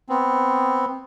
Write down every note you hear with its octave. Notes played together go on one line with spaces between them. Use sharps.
B3 C4